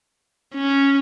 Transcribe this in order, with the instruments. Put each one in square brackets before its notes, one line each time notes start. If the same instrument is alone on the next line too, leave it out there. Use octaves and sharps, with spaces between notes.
[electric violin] C#4